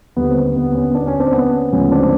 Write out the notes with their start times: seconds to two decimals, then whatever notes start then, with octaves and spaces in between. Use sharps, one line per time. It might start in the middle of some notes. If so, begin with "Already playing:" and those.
0.16 D#2 D3 G3 B3
0.30 C4
0.36 B3
0.56 B3
0.75 B3 C#4
0.95 D4
1.07 C#4
1.20 C4 D4
1.33 B3 C#4
1.72 D2 C#3 F3 G#3 B3 C#4
1.92 C4 D4